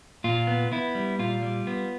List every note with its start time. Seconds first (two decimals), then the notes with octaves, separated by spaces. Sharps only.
0.24 A#2 F4
0.47 B3
0.72 B3 E4
0.95 G3
1.19 A#2 F4
1.43 G3
1.67 B3